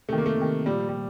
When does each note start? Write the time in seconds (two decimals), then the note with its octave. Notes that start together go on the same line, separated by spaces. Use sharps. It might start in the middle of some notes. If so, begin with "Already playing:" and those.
0.09 C3 D#3 A3
0.18 A#3
0.26 A3
0.38 C3 D#3
0.66 A#2 F3 G3
0.89 G3